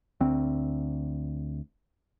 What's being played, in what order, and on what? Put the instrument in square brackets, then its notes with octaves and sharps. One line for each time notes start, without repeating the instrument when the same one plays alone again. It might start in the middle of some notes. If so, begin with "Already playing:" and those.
[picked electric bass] D2 C4